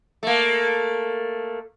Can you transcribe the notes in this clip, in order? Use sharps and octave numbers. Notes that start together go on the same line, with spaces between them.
A3 A#3